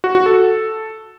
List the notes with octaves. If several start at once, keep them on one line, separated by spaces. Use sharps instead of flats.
F#4
F#4
A4